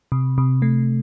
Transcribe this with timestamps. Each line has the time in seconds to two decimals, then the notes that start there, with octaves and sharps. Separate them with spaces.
0.12 C3
0.38 C3
0.62 A3